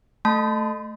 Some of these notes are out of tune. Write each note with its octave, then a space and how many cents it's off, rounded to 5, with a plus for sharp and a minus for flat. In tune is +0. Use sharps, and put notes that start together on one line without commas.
A3 +0 A5 -5 C6 -25